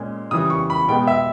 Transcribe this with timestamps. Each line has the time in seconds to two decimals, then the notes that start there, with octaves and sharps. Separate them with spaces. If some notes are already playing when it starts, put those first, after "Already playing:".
Already playing: A#2 G#3 C#4
0.31 C#3 E3 G3 D#6
0.50 C#6
0.70 B5
0.88 B2 G#3 B3 G5
1.07 E5